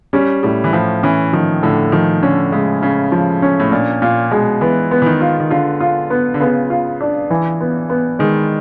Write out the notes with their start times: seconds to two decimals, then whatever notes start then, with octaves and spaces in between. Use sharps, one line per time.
0.13 G3 C#4
0.43 A2 G3
0.64 E3
0.73 A2 F3
1.03 E3 C#4
1.33 D#3 F3
1.63 A2 D3
1.92 D#3 F3
2.23 D3 C#4
2.52 C#3 G#3
2.82 C#3 C#4
3.12 F3
3.42 C#4
3.60 A2
3.72 A#2 D4
4.02 A#2 F4
4.31 B2 G#3
4.61 E3 B3
4.91 B3
5.02 E3
5.06 D#3
5.21 F4
5.40 D#3
5.51 D3 F4
5.80 F4
6.10 B3
6.34 D3
6.40 C#3 B3
6.70 F4
7.01 D4
7.30 E3
7.61 B3
7.90 B3
8.19 D#3 G#3